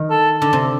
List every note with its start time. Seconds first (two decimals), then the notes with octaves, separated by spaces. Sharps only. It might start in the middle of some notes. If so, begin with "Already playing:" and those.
Already playing: D#3
0.10 A4
0.38 D3 A4
0.53 C3